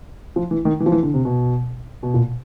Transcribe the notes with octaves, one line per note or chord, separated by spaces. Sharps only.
F3
E3
D#3
E3
F3
E3
D3
C3
B2
B2
A#2